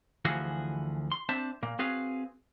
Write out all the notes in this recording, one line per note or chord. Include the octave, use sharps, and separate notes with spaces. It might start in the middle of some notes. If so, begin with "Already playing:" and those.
D2 E3 F3 F#4 G#4 F5
C6
C4 D4 C5 E5 A5
A#2 A#3
C4 F#4 G#4 B4 F5